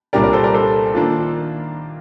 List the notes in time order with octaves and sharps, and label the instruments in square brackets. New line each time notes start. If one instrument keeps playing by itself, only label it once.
[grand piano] C2 A#2 G3 D4 G4 [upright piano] A#4 D5
[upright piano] A#4 D5
A4 C5
A#4 D5
A4 C5
[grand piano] D#3 A#3 D4 F4